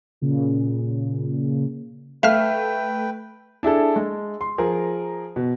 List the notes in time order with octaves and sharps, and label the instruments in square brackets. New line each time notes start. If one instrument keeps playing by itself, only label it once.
[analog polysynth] A#2 C#3
[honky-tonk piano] A3 [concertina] B4 G5 [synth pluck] E5 F5 F6
[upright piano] D4 E4 G#4 A4
G#3
C6
F3 G#4 A#4
B2